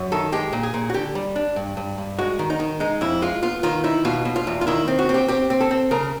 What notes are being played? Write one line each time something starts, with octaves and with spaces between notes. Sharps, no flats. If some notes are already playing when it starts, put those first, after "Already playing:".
Already playing: F#2
D#3 A4
G#3 G4
A#2
G#4
A#2
F#4
D3 G4
G3
D4
G2
G2
G2
G#3 F#4
D#3
D#4
D#3
G#3 D#4
F2 E4
G#3 F4
B3 F4
D#3 F4
D#4 E4
B2 F4
B2
F4
E2
F4
D#3 E4
C4
F#4
C4
G4
C4 G4
C4
A4
C4
C#3 A#4